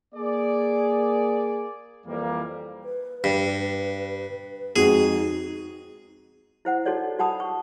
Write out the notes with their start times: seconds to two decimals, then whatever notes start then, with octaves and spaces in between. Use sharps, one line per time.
0.15 A#3 G#4 D5
2.06 F2 E3 G3 A#3
2.84 B4
3.24 G2
4.76 F2 G#3 D#4 F#4 G#4
6.65 E4 C5 F#5
6.86 D#4 F#4 A4 C#5 D5
7.19 F#4 F#5 A5 B5 D#6
7.40 C#6